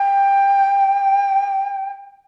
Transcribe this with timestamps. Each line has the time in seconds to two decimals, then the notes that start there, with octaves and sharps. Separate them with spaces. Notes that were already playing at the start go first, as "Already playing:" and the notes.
Already playing: G5